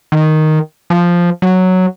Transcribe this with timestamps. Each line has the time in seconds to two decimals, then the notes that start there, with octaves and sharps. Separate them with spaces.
0.12 D#3
0.90 F3
1.42 F#3